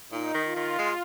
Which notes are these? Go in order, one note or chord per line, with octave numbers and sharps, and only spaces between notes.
A#2 D#4
D#3
F4
D#3
G#3